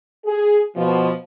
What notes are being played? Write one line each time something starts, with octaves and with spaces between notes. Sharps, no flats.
G#4
B2 F3